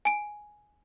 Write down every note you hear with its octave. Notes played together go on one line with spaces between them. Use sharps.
G#5 D7